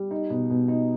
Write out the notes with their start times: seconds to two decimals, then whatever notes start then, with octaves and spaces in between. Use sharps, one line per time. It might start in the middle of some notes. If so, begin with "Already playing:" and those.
Already playing: G3
0.11 D#4
0.30 B2
0.50 B2
0.68 D#4